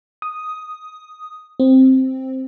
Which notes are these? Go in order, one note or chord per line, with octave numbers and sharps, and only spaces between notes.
D#6
C4